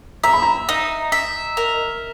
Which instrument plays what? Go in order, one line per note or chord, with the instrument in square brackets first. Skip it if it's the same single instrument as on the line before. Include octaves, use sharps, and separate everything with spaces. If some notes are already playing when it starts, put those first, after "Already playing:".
[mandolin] E5 [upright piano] A#5
[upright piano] B5
A#5
[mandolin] D#4
E5
A#4